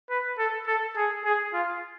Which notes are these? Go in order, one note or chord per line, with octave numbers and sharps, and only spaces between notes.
B4
A4
A4
G#4
G#4
F4